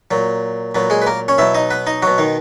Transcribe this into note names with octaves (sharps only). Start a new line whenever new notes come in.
A#2 F#3
A#2 F#3 B3
G#3 G#4
B4
A#3 A#4
C#4 C#5
B2 F#3 E4 E5
D#4 D#5
B3 B4
D#4 D#5
B2 F#3 F#4
D#3 D#4